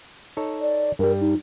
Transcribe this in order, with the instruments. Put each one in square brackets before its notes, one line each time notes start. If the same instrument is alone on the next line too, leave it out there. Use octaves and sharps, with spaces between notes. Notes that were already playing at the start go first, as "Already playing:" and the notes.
[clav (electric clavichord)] D#4 A4 C#5
[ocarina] D5
[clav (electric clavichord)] G2 G3 [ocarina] A#4
[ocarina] D#4